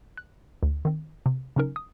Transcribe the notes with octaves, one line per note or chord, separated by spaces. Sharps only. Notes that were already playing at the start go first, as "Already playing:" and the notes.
F#6
D2
D#3 C4
C3
C#3 F#3 C#4 D#4 A#4
D#6